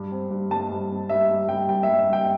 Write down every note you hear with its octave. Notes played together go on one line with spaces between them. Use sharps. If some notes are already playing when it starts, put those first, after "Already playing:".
Already playing: G2
C4
G2
G2 A5
G2
C4
G2 E5
G3
G2 G5
G2 G5
E5
G2
E5
G2 G5